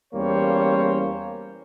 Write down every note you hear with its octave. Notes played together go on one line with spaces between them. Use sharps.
E2 G3 A#3 C#4 C5 C#5